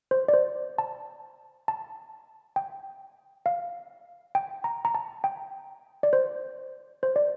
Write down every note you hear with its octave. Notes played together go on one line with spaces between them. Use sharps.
C5
D5
C5
A5
A5
G5
F5
G5
A#5
A#5
A5
G5
D5
C5
C5
D5